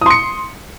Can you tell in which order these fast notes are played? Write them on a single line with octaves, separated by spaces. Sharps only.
D#6 C6 C#7